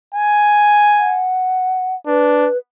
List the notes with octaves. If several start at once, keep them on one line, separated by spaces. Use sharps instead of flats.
G#5
F#5
D4 B4